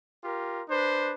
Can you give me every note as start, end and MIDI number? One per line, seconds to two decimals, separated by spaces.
0.24 0.62 65
0.24 0.62 67
0.24 0.62 70
0.69 1.14 62
0.69 1.14 71
0.69 1.14 72